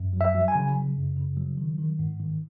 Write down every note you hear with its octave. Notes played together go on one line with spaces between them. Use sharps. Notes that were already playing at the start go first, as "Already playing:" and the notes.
Already playing: F#2
F#3
E5
F#3
G#5
C#3
C#3
F#2
C#3
F#3
D#3
D#3
G#2
D#3